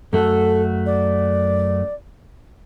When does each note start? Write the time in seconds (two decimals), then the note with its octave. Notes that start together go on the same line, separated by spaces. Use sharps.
0.13 F#2 A3 F#4 A4
0.86 D5